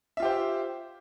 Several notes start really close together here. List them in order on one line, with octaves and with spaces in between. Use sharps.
E5 F4 G4 C5